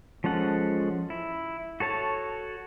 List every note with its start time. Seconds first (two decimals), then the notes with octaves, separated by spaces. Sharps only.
0.24 F3 G#3 C#4 A4 F#5
1.10 E4
1.80 F#4 A4 C#5 A5